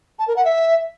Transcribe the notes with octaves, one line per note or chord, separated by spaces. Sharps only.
A5
A#4
F#5
E5